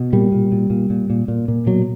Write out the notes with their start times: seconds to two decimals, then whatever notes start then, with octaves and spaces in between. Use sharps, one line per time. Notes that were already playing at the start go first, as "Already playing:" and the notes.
Already playing: B2
0.13 A#2 G3
0.32 A#2
0.52 A#2
0.70 A#2
0.90 A#2
1.10 A#2
1.28 A#2
1.48 A#2
1.66 B2 F#3